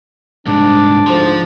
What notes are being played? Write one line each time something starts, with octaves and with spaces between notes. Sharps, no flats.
C2 G#2 D4
D2 G#2 F3 C5